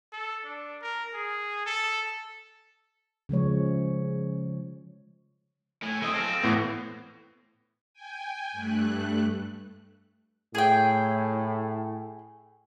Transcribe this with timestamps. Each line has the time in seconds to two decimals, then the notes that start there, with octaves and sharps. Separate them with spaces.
0.13 A4
0.45 D4
0.82 A#4
1.14 G#4
1.66 A4
3.29 C#3 F3 G#3 C#5
5.83 A2 G#5
6.02 A3 C4 D#5
6.14 A4 F5 A#6
6.43 A2 E3 B3
7.94 G5 G#5
8.52 G2 A3 F#6
10.55 A2 G#4 G5